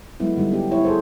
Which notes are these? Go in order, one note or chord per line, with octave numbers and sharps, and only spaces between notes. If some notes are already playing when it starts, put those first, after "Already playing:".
F#3 G#3 A3 B3 E4
D3 G3 D#4
B3 D4 G4
E4 C#5
G#4 A4 C5